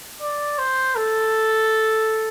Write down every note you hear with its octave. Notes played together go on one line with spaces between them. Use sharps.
D5
C5
A4